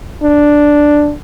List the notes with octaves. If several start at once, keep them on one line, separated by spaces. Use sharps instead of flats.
D4